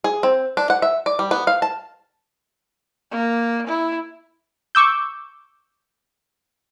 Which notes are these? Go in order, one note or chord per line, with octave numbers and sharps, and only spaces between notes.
G#4
C4
D4
F#5
E5
D5
G3
B3
F5
A5
A#3
E4
C#6 D6 E6 G6